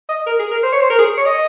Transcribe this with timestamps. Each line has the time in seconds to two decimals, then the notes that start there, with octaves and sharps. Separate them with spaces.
0.09 D#5
0.26 A#4
0.39 G#4
0.51 A#4
0.63 C5
0.73 C#5
0.81 C5
0.90 A#4
0.99 G#4
1.17 C#5
1.26 D#5